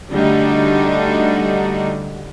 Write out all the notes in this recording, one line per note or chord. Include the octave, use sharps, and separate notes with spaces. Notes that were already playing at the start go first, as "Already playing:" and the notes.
D3 G3 A3 D4 D#4 F#4